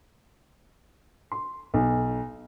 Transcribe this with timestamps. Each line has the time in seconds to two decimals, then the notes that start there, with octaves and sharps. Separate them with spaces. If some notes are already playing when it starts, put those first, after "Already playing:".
1.32 C6
1.74 B1